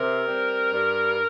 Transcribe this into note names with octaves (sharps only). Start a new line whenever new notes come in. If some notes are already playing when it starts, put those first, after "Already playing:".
Already playing: C3 A#4
G3 C4
G2